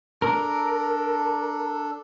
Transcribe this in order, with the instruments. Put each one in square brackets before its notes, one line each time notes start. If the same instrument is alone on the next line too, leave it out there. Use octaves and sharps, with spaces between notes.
[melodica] D4 A4 [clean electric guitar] A#4